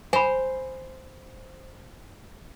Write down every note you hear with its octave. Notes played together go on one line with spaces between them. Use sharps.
C5 G#5 B5